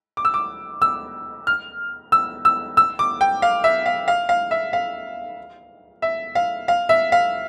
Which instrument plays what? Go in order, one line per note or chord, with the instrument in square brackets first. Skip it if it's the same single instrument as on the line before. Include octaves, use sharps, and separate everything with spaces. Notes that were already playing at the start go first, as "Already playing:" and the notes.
[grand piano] D6
E6
D6
E6
F6
E6
E6
E6
D6
G5
F5
E5
F5
F5
F5
E5
F5
E5
F5
F5
E5
F5